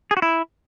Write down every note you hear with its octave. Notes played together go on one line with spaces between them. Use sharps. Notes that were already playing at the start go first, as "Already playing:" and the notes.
G#4
F#4
E4